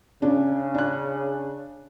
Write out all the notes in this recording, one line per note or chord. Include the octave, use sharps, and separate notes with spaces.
C#3 C#4 D4
D4 F#6